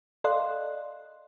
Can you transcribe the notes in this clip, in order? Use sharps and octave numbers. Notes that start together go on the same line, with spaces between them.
A4 D5 D#5 F5 C6 F#6